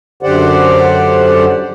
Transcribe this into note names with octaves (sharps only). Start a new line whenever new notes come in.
F#2 D3 G4 C5 D5 F#5